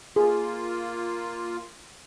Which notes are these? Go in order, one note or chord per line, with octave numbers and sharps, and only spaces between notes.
A#3 F4 G#4